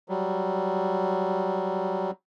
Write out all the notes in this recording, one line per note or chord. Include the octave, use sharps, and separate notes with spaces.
F#3 G3